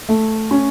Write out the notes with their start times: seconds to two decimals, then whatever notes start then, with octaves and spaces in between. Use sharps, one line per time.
0.09 A3
0.51 C#4